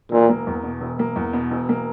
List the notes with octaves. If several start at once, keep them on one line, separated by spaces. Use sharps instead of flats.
E1 A#2
A#3
E2
B2
E1
A#3
E2
B2
E1
A#3